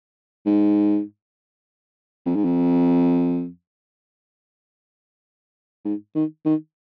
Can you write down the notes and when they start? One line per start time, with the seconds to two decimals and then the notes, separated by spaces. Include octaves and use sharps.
0.46 G#2
2.26 F2
2.35 G#2
2.45 F2
5.85 G#2
6.15 D#3
6.45 D#3